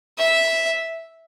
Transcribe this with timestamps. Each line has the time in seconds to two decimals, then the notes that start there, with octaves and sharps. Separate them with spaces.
0.18 E5